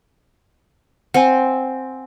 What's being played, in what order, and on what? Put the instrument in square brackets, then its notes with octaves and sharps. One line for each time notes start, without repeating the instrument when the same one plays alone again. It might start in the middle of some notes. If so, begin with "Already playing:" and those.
[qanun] C4 [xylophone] F#5 G#5